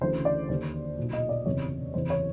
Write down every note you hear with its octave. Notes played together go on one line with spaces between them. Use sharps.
D2 C#3 E3 C5
D5
D#2 D3 C5
B1 A#2
D#5
D5
F#1 E2 C3 C#5
F#1 E2 C3 E3 C5
C#5